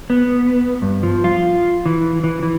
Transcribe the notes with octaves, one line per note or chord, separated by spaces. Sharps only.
B3
G2
F3
F4
E3
E3
E3